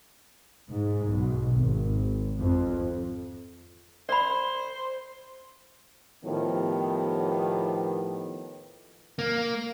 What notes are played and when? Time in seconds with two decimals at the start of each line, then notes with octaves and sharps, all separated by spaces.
0.69 G#2
1.07 B1
1.53 G#1
2.39 F2
4.09 C5 D5 B5
6.24 A2 D#3 F3 B3 G4
9.19 A#3